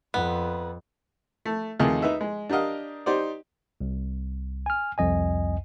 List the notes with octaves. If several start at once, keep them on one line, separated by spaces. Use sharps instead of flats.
F2 B3
A3
D#2 C3 A3 F4 G#4 D#5
D#4 B4 E5
G#3
D4 G4 A#4 D#5 F5
D#4 G4 C5 D5
C2
G#5 F6
C2 F2 D#5 G#5